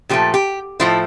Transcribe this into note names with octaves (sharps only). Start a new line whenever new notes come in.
A#2 F3 A3 G4
G4
A2 F3 A3 E4